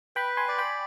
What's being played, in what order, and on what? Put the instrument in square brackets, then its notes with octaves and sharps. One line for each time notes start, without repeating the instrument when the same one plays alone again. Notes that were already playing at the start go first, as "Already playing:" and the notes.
[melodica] B4 [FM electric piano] G5 B5
[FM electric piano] G#5 C6
[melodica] D5
[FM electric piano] G5 B5